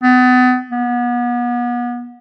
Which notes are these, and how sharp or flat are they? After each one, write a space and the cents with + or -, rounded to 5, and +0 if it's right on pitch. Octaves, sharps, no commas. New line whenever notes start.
B3 +35
B3 -35